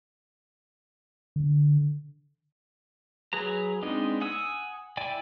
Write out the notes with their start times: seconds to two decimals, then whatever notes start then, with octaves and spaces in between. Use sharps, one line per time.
1.36 D3
3.33 F#3 G#4 B4 A#5
3.83 G#3 B3 C4 D4 D#4
4.21 F#5 G#5 D#6 E6
4.97 E4 D5 G5 G#5